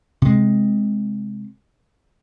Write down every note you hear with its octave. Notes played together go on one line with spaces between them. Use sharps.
C3 G#3